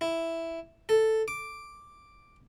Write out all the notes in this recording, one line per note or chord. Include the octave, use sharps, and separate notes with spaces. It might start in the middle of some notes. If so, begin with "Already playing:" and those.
E4
A4
D6